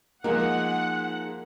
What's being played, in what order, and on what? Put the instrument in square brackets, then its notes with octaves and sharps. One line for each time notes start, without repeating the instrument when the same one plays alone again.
[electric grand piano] F3 G#3 A#3 [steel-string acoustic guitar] D#4 F4 G#4 [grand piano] A#4 [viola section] F#5